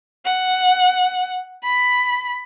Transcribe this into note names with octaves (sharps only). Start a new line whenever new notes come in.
F#5
B5